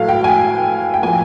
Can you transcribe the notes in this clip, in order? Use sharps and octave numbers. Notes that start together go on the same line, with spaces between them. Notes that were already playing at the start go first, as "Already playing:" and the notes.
Already playing: A2 F#3 A3 F5
G5
G#5
G5
A2 F3 A#3 G#5